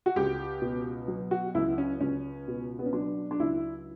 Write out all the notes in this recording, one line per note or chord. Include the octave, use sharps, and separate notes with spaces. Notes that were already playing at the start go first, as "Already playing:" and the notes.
F#4
C#2 G4
B2
F#3
F#4
C#2 E4
C#4
C#2 C#4
B2
B3
C#4
F#3 D4
D4
C#2 E4